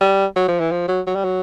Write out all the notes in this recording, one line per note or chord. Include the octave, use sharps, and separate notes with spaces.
G3
F#3
F3
E3
F3
F#3
F#3
G3
F#3